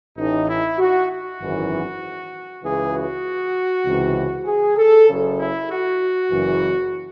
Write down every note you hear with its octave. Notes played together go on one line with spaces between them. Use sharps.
A1 A2 E3 D#4
E4
F#4
F#4
G#1 F#2 E3
C#2 C#3 E3 G#4
F#4
C#2 C3 E3
G#4
A4
F#1 F#2 C#3
E4
F#4
F#1 F#2 E3